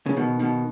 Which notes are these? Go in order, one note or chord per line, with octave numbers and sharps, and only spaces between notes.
C#3
B2 D#3
B2 D#3